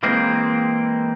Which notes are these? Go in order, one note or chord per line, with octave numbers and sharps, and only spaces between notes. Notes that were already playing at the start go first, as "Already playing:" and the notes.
E3 G#3 A#3 C4